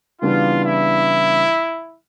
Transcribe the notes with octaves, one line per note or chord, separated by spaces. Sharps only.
C#3 E3 G3 B3 D4 F4
E4